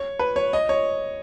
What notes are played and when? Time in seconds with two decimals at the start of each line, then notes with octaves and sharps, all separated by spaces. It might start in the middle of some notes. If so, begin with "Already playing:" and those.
Already playing: C#5
0.19 B4
0.36 C#5
0.53 D#5
0.69 C#5